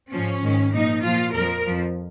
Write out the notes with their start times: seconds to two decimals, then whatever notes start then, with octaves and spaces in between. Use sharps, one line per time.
0.13 G#2 F3 C#4
0.43 G#2 D#3
0.74 A#2 F3 D#4
1.05 A#2 F3 F4
1.35 F2 F3 A#4
1.66 F2 F3